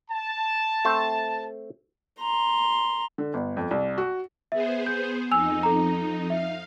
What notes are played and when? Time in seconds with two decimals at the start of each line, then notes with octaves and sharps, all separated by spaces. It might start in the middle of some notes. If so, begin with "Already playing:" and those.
0.11 A5
0.85 A3 C4 C5
2.19 A#5 C6
3.18 D3
3.34 G1
3.57 F2
3.71 C2
3.98 F#4
4.52 B3 G#4 C5 E5
4.86 G6
5.31 F2 D#4 G#5 E6 F7
5.63 A4 A#5
6.30 E5 F5